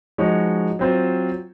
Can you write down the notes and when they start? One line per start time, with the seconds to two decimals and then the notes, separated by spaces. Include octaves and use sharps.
0.18 F3 G#3 D#4 F#4 C#5
0.79 F#3 C4 F4 C5